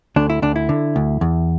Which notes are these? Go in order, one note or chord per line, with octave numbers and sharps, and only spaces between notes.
D2 D4
E4
D2 D4
E4
D3
D2
E2